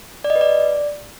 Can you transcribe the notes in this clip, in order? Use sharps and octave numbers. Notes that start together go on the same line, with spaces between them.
D5
D#5
B4
D5